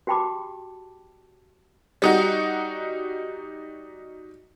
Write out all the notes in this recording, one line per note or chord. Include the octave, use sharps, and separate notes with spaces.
F#4 G4 G5 A5 B5 D6
G3 D#4 F#4